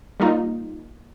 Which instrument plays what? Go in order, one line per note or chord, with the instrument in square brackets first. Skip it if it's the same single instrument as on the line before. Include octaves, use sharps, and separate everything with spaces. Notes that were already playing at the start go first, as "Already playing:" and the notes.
[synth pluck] G3 A#3 D#4 F4